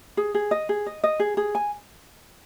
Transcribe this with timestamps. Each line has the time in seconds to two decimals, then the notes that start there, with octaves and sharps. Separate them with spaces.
0.17 G#4
0.35 G#4
0.51 D#5
0.69 G#4
0.86 D#5
1.03 D#5
1.20 G#4
1.37 G#4
1.55 G#5